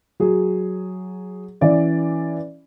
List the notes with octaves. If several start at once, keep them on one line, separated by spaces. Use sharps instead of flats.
F#3 F#4 G#4
E3 C#4 D5 E5